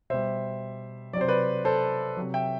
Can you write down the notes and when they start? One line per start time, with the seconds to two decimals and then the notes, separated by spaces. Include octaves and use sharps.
0.10 B2 G3 C5 E5
1.13 F#3 D5
1.17 C3 C5
1.29 B4 D5
1.65 A4 C5
2.17 C3 F#3
2.34 E5 G5